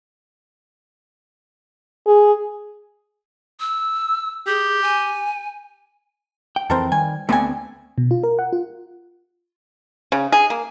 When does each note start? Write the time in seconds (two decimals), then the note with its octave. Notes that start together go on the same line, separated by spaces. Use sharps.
2.07 G#4
3.60 E6
4.47 G4 G#4
4.82 G#5
6.56 G5
6.70 F2 E3 C4 A4 A#4 C5
6.92 D#3 G3 G#5
7.29 D2 D3 G3 A3 B3 C4 G#5
7.98 B2
8.11 F4
8.23 A#4
8.39 F#5
8.53 F4
10.12 C#3
10.32 G#4
10.50 A#3